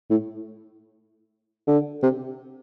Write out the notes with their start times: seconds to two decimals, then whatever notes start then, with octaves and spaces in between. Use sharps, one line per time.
0.11 A2
1.67 D3
2.03 C3